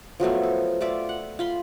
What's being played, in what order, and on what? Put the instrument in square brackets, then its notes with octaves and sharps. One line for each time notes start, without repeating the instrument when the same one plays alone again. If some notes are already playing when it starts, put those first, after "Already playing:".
[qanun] F3 F#3 A3 B3
A4
A3 F4 D5 E5
F#5
F4 B5 C6